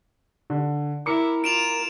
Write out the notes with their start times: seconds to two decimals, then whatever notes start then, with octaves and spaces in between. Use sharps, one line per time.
0.50 D3
1.06 E4 A#4 D6 C#7
1.44 F4 D7 E7 F7